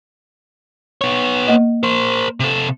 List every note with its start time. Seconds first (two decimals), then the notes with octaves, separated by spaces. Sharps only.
1.01 B3 C#5
1.48 A#3 D#5
1.83 A#4 C5
2.40 C3 A4